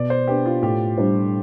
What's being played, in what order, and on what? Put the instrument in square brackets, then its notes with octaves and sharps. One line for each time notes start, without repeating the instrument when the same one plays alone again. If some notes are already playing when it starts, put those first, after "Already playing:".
Already playing: [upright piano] B2 [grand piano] D5
[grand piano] C5
[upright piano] B3 D4 [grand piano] G4
[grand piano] F4
[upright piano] A2 [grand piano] G4
[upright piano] G3 D4 F4 C5